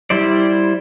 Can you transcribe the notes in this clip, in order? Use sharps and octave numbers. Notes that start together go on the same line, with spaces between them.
G3 E4 C5 D5